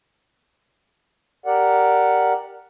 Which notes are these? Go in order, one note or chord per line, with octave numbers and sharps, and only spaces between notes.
G4 A#4 D5 F#5